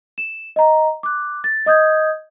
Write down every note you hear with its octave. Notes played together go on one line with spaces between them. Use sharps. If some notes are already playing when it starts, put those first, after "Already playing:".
E7
D#5 A#5
D6 F#6
A6
D#5 D#6 G6 G#6